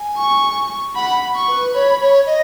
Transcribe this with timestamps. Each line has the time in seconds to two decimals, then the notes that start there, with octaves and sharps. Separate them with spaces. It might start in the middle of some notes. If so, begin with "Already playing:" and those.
Already playing: G#5
0.17 C#6
0.96 F#5 B5
1.35 C#6
1.48 B4
1.74 C#5 B5
2.01 C#5
2.26 D#5